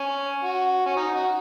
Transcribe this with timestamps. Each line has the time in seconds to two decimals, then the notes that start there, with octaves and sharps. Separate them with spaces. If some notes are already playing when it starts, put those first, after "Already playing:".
Already playing: C#4
0.44 F#4
0.86 C#4
0.97 D#4
1.15 F#4